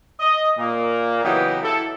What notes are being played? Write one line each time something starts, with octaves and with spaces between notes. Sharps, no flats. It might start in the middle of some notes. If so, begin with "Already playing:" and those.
D#5
A#2 A#3
C#3 E3 F#3 B3 D#4 G4
E4 A4